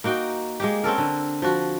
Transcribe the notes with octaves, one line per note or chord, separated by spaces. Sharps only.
A#3 D#4 F#4 G5
G#3 A#3 G4
C4 C#4 A4 A#4
D3
F3 F#4